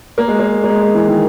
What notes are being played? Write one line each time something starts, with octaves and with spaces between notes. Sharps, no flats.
A#3
G#3
A#3
A#3
G#3
G#3
E3
D#3